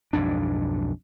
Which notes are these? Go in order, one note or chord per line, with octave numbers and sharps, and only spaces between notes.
B1 F2 G#2 D4